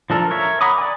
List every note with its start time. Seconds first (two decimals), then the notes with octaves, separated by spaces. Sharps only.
0.10 F3 D4 A4 A#4
0.30 A#4 C#5 E5
0.61 F#5 A#5 B5 D6 D#6
0.78 D5 G#5